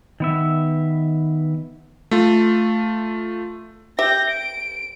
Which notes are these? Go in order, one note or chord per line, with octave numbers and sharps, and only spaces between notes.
D#3 B3 E5
A3 F4
G4 E5 G6 A#6
D7